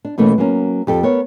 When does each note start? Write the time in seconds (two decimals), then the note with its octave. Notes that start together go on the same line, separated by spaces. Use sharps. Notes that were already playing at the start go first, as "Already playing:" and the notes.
0.05 D4
0.18 B2 E3 A3 A#3 C#4
0.38 F#3 A#3 C#4
0.87 F2 G4 A4
1.03 B3 A#4 C#5